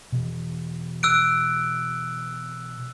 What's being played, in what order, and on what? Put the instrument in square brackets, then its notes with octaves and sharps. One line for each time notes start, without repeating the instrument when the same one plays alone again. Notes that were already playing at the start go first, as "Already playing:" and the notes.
[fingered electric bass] B2 E3
[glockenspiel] E6 F#6 D7